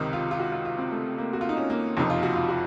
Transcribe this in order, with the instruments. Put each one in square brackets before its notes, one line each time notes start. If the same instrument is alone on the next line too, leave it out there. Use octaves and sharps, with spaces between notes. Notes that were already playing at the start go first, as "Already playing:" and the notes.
Already playing: [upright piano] C#2 C3 D#3 D#4
F4
F4
F#4
F4
F4
C4
A3
A#3
F#4
F4
D#4
C#4
A#3
F#1 F2 C3 F3 D#4
F4
F#4
F4
F#4